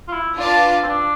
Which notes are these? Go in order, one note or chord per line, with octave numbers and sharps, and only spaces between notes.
F4
E4
D4 F4 B4 F5 A5
C4
D4